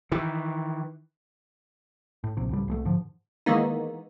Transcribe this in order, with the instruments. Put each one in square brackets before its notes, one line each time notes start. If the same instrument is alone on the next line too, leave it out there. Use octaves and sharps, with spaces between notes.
[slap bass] D#3 E3
[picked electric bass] A2
A#1 D#2 C3
C#2 A2 G3
C2 G#3 A3
G#2 D3 F3
[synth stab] D#3 E3 G#3 A#3 B3 D#4